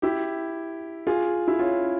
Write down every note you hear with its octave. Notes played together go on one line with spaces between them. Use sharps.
E4 G4
F4 G#4
E4
C#4 F4